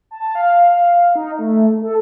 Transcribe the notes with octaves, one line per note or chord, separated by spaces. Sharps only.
A5
F5
D#4
A3
A4